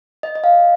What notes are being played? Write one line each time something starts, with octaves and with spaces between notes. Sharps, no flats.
D#5
D#5
F5